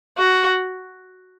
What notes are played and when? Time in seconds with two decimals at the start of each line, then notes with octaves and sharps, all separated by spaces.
0.18 F#4